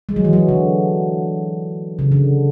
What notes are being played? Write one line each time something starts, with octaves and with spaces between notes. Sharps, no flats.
G#3
F#3
E3
F#3
D3
C#3
D3